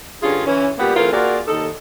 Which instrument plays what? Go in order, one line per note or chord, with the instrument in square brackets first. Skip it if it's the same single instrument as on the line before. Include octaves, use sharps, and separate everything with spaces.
[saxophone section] G2 D3 C#4 F4 G#4
E3 C#4
A#2 G3 A#3 B3 G4
E3 A3 C4 F4 G#4 A#4
A#3 F4 F#4 G#4 A#4 D5
D#2 D#4 A4